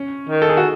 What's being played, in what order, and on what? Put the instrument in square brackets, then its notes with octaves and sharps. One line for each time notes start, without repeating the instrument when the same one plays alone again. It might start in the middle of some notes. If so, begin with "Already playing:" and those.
Already playing: [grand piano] C#4
[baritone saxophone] D#3
[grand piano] A4
G#4
F#4